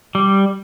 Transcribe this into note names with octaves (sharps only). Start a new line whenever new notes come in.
G3